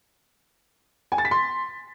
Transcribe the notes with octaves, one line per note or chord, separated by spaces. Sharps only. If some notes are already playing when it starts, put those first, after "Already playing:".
G#5
A6
B6
C6